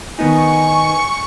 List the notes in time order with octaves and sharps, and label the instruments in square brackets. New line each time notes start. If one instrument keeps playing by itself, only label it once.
[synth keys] D#3 B3 D#4 [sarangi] G#5 [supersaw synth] C#6 C#7